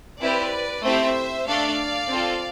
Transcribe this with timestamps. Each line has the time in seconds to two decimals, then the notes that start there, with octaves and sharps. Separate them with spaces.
0.20 C4 E4 G4 B4 D5
0.83 A3 C4 E4 G4 C5 E5
1.46 A3 D4 A4 D5 F5
2.10 C4 F4 A4